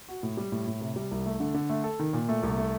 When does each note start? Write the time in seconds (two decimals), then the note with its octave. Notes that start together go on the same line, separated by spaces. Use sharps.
0.08 F#4
0.23 A2
0.37 G3
0.52 A2
0.67 A2
0.81 C3
0.96 G3
1.11 C2
1.26 A3
1.40 D3
1.54 D3
1.70 A3
1.84 A4
1.99 D#3
2.13 A#2
2.29 A3
2.43 C2
2.58 A3